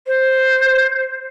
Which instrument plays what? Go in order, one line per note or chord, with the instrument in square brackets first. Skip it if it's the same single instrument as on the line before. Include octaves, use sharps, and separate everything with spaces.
[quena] C5